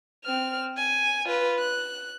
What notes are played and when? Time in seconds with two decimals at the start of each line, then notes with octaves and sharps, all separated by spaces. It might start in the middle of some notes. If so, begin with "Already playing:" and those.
0.25 C4 F6
0.77 G#5
1.26 F4 B4
1.59 F#6